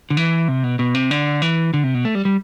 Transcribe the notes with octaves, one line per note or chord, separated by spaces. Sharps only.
D3
E3
C3
B2
B2
C3
D3
E3
D3
C3
B2
A3
G3
G3